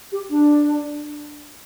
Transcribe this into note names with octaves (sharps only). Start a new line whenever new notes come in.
G4
D4